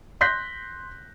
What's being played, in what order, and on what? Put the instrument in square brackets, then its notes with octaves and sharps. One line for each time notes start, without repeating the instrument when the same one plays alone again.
[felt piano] C6 F#6 G6 A#6 B6